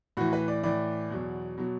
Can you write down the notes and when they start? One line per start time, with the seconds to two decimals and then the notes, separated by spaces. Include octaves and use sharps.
0.17 A2 E3 F#4
0.33 B4
0.48 D5
0.63 A2 E3 D5
1.10 E2 B2 F#3
1.58 B2 F#3